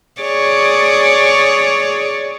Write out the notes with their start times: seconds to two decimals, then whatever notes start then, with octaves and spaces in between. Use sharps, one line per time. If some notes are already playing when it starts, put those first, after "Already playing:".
0.22 G#4 C#5 D5